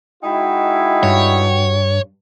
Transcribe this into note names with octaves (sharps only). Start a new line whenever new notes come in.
G#3 D#4 E4 F#4 G5
G2 C#5